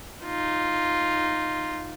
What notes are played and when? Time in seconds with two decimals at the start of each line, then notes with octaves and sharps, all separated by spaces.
0.25 D#4 F4